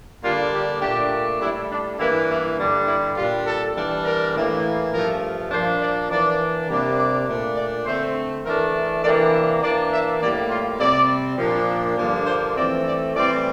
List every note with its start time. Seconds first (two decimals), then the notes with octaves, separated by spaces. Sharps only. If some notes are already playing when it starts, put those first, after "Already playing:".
0.23 D3 G3 A#3 D4 F4
0.53 G4
0.81 A#2 A3 D4 G4
1.41 A2 G3 D4 E4
1.70 D4
1.99 G2 E3 A#3 D4 E4
2.28 E4
2.58 G2 D3 G3 D4
2.86 E4
3.16 A#2 G3 D4 F4
3.46 A4
3.75 E3 G3 D4
4.05 A#4
4.34 A2 E3 A#3
4.92 G2 F3 A3 A#4
5.51 A#2 F3 A#3 D4 C5
5.81 D5
6.09 E3 A#3 D4 D5
6.69 C3 G3 A#3 D4
6.98 D5
7.28 A#2 A3 D4
7.56 D5
7.86 D3 A3 C4 C5
8.44 E3 A3 D4 A#4
9.03 C3 E3 A#3 D4 D5
9.33 E5
9.62 E3 A#3 D4 D5
9.91 E5
10.21 A2 G3 A#3 D5
10.50 F4
10.79 C3 G3 C4 D5
11.38 A#2 F3 A#3 D4
11.97 G2 D3 F3 A#3 D4
12.26 C5
12.55 E3 A3 C4 D5
12.85 D5
13.14 A2 E3 G3 C4 D5